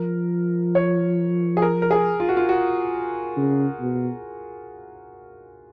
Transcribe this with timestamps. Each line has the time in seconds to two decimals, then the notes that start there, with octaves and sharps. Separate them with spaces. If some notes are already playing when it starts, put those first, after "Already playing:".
Already playing: F3 A#4
0.75 C#5
1.57 G#4
1.62 A#4
1.82 A#4
1.91 G#4
2.20 F4
2.29 F#4
2.37 F4
2.49 F#4
3.36 C#3
3.80 B2